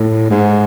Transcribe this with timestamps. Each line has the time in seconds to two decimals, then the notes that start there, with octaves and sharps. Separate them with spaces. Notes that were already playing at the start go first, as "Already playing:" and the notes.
Already playing: A2
0.30 G#2